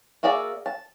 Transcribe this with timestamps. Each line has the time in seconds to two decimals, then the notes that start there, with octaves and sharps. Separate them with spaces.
0.23 A#3 F#4 G#4 D5 E5
0.66 A5